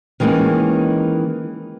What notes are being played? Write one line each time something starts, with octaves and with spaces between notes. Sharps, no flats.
D#3 E3 G#3 A#3 C#4